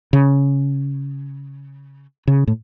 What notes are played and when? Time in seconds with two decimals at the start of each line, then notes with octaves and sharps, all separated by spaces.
0.13 C#3
2.27 C#3
2.47 A2